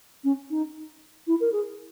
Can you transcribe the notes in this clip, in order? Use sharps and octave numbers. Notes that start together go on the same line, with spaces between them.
C#4
D#4
E4
A#4
G#4